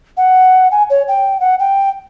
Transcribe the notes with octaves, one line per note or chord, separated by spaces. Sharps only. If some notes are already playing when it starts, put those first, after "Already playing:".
F#5
G#5
C#5
G5
F#5
G5